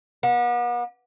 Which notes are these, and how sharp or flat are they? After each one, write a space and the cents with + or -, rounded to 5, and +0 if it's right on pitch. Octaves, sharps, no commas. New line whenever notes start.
B3 -40